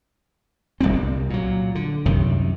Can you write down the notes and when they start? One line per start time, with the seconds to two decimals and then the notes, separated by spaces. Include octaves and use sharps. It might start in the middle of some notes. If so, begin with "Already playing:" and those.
0.81 D1 G1 G3 C4
0.96 C2
1.30 A#2 F#3
1.75 D3
2.06 C2 F#2 C3 D#3